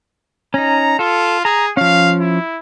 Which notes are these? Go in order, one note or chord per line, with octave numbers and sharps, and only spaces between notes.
C#4 D#4 A#5
F4 A4
G#4 A#5
F3 C#4 F5
E4